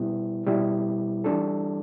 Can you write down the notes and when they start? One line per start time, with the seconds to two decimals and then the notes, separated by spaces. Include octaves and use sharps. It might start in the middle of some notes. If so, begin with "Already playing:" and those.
Already playing: B2 G3 B3 E4
0.47 B2 G3 B3 E4
1.24 E3 G3 D4 A4